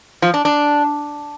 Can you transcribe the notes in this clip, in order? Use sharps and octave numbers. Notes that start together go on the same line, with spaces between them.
F3
D4
D4